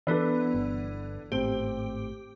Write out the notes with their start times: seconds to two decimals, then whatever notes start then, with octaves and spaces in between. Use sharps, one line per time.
0.07 E3 B3 D4 A4 B4
0.54 G1
1.32 G#1 A2 C4 G4